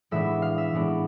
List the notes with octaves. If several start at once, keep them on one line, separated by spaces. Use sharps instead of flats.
A2 E3 G#3 B3 D4 E5
F5
E5
A2 E3 G#3 B3 D4